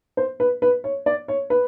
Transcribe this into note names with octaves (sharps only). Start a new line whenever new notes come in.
C5
B4
B4
C#5
D5
C#5
B4